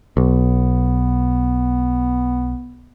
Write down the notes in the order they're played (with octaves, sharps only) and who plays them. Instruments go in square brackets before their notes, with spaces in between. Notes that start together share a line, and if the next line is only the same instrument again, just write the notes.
[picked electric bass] B1 [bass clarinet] B3